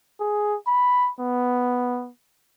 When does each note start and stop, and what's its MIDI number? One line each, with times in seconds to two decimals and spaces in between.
0.20 0.56 68
0.67 1.10 83
1.19 2.10 59